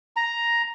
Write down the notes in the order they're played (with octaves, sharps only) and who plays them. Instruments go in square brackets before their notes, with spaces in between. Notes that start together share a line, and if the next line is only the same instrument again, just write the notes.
[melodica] A#5